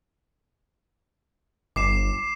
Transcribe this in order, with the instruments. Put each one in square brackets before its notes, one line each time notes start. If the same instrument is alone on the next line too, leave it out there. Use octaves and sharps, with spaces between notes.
[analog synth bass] G1 [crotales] D6 C7 E7